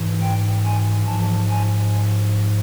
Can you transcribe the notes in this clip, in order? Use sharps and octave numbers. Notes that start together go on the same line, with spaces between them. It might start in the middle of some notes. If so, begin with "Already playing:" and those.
Already playing: G#2 E3
G5
G#5
G#2 F3 A5
G#5